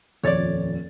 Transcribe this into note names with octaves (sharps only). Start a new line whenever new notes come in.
D#1 F2 C#5 D5 A6